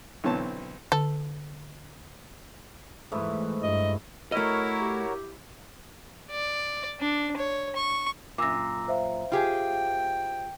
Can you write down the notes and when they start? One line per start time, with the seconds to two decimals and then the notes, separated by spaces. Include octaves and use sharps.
0.24 B1 D3 E3 C4 C#5 A5
0.92 D3 A4
3.12 G#2 E3 A3 E4
3.63 G2 D#5
4.32 A3 E4 F#4 A#4 C#5 D#5 F6
4.80 G4
6.31 D5
7.00 D4
7.37 C#5
7.76 C#6
8.38 F#2 A#2 D6 E6 A#6
8.88 C5 E5 F5
9.32 F4 G4 G#4 G5